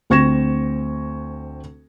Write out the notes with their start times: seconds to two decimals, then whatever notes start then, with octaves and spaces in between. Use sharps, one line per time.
0.10 D2 C4 C#6 G#6 A#6 E7